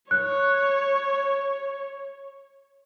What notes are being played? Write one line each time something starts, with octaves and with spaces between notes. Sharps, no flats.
C#5 F#6